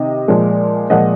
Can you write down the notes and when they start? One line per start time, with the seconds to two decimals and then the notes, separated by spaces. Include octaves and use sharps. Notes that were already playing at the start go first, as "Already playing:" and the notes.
Already playing: C3 D#3 D#5
0.28 A#2 F3 G#3
0.90 A#2 F3 G#3 D#5 F#5